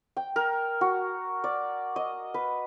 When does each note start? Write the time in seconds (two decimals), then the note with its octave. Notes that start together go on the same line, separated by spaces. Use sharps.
0.17 G5
0.36 A#4
0.81 F#4
1.44 D5
1.96 D#5
2.34 B4